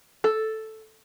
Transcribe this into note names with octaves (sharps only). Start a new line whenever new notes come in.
A4